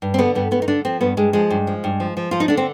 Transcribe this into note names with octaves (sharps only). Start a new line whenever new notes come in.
G2
C4
D3 B3
G2 B3
G2 B3
D#4
D3 D4
F3 C4
G2 B3
G2 G#3
F3 G#3
G2
F3
G2
F3
F3
F3 F4
D#4
D3 D4
C4